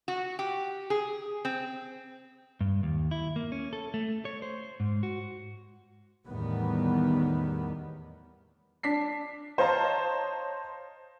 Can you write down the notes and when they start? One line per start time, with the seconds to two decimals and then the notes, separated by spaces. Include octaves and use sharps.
0.08 F#4
0.39 G4
0.90 G#4
1.45 C4
2.61 G2
2.83 D#2
3.11 E4
3.36 A#3
3.52 C#4
3.73 A4
3.94 A3
4.25 C#5
4.42 C5
4.80 G#2
5.03 F#4
6.27 E2 A2 D#3 G3 B3
8.83 D4 B6 C7
9.58 C5 C#5 D#5 F5 A5 A#5